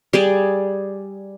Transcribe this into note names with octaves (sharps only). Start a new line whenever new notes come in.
G3 G#4 D5